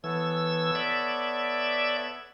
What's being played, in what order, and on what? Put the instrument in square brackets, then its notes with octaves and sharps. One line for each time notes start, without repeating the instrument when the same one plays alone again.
[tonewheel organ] E3 E6 [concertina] B3 A4 C#5
[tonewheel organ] D5 E5